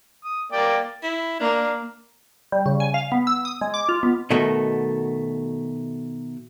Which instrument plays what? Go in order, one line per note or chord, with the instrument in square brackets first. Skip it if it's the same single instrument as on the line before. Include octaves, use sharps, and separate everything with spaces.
[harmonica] D#6
A#3 D5 G5
[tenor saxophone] E4
[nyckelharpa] A#3 [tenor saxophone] D4
[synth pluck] G3
C#3
G#5
F5
B3
E6
D#6
G#3
D6
F4
B3
[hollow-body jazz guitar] B2 D#3 A3 F#4